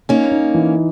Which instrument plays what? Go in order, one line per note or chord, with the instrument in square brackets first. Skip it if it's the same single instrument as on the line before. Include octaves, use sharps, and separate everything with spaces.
[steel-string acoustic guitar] A#3 C#4 [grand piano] D#4
[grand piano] D#4
E3